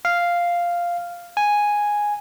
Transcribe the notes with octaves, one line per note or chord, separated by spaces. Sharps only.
F5
G#5